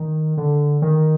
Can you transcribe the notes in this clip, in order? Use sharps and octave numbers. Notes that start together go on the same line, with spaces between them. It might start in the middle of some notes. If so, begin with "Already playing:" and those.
Already playing: D#3
D3
D#3